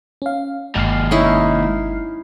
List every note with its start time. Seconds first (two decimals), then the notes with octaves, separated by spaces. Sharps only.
0.22 C#4 F5
0.76 G1 D#2 G#2 F6 C7
1.11 C#4 D#4 E4